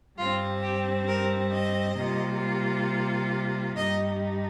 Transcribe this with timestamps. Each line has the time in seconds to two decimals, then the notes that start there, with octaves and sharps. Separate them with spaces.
0.17 G2 G3 C4 F4
0.62 G4
1.07 A#4
1.51 D#5
1.96 C3 G3 A#3 F4
3.75 G2 G3 D#4 D#5